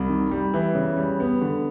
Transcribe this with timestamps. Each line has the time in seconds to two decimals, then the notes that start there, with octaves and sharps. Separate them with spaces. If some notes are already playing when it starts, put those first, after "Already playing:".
Already playing: C2
0.09 D#3
0.31 G3
0.54 E3
0.75 C#3
0.97 G3
1.20 B3
1.41 D3